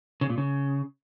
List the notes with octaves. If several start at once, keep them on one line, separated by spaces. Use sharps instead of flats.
C#3
A#2
C#3